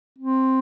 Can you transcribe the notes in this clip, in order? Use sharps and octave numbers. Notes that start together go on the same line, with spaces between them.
C4